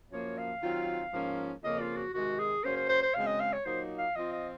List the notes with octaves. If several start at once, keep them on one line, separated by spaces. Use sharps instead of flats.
F#2 F3 A#3 C#5
F5
D#3 F#3 C4 F4
G#2 F3 A#3 C#4
F2 C#3 F3 A#3 C#4 D#5
F4
F#4
C3 D#3 G#3 F#4
G#4
F#2 C#3 F#3 A#3 C#4 C5
C5
C5
C5
F#2 C#3 G#3 C4 F5
D#5
F5
C#5
A#2 F#3 A#3 D#4 C5
F5
F3 C4 F4 D#5
D#5